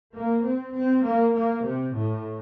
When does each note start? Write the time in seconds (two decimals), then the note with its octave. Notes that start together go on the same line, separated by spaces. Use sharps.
0.14 A#3
0.44 C4
0.74 C4
1.04 A#3
1.34 A#3
1.64 C3
1.94 A2